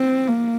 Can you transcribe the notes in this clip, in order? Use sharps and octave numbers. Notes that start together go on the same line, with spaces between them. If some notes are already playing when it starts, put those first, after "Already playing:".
Already playing: C4
A#3